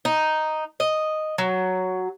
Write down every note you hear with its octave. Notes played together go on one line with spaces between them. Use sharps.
D#4
D#5
F#3